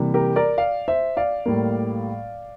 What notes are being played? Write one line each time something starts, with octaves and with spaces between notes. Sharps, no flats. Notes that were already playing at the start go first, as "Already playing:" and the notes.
Already playing: C3 E3 G3 A#3
G4 A#4
A#4 D5
D5 F5
C5 E5
D5 F5
A2 G3 A#3